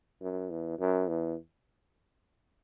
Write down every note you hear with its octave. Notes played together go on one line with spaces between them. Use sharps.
F#2
E2
F#2
E2